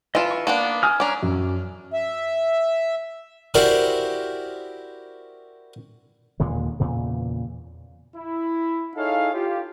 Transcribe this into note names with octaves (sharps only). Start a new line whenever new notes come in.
E3 F4 D#5 A5
C#6
A#3 B3 D4
G#5 D#6 F6
C#4 D4 G#5 A#5 D6
F#2
E5
E4 F#4 G4 A#4 C5 D5
D#2 A#2 D3 G#3
E2 A#2 C#3
E4
D#4 E4 G#4 A4 C#5 F5
F4 G4